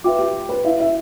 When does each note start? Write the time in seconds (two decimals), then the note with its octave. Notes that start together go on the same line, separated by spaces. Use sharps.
0.04 F4 B4 E5 G5 D6
0.19 G4
0.49 B4
0.64 E4 B4 E5 F5
0.80 E5